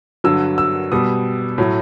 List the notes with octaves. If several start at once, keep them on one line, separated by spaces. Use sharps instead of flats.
G2 D3 F#3 E6
E6
B2 G3 D#6
A2 F#3